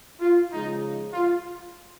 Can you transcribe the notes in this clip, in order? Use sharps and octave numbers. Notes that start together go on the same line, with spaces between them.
F4
C#3 F3 G#3 D#4
F4